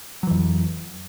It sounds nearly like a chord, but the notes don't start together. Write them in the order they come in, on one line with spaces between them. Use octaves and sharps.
F#3 E3 F2